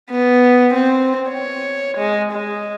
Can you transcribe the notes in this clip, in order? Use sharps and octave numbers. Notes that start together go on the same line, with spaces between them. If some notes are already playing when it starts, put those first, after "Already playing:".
B3
C4
C#5
G#3
G#3